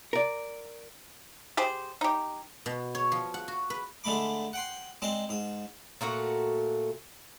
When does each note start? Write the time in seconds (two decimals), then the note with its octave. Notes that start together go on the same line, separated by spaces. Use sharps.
0.13 A#4 D5
1.57 G4 G#4 C5
2.01 D#4 G4
2.66 B2
2.95 C#5
3.12 F3
3.34 F#5
3.48 F#4
3.70 B4
4.04 D3 G#3 A3 B5 D6
4.53 F#5 G5 C6
5.02 G#3 C4 D4 D#5
5.29 G#2 D#6
6.01 A#2 A3 F#4 F#5